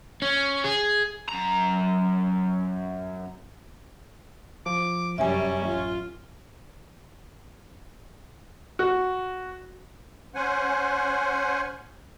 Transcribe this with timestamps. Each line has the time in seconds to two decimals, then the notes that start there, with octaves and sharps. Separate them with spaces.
0.22 C#4
0.64 G#4
1.29 F#2 A#5
4.66 F3 D6
5.18 F1 F#2 G3 C#4 E5 G#5
5.65 A1 F4
8.79 F#4
10.35 C#4 C5 F#5 G#5